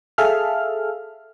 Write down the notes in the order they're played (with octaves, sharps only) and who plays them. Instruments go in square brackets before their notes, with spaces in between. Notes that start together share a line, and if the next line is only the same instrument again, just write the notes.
[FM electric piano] G#4 A4 E5 F5 F6